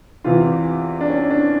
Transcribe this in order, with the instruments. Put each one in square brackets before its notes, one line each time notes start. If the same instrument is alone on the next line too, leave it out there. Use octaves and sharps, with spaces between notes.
[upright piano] E2 C3 E3 F4
D4
C#4
D4